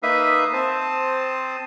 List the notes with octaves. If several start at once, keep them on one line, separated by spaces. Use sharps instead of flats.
A#3 D#4 B4 E5 F5 D#6
C4 C5 A5 D#6